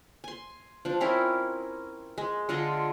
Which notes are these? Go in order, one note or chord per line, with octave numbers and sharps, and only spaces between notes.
G#5 C6
F3 D4
C4 C#4 E4 A#4
G#3
D3 G#3 F4 D#5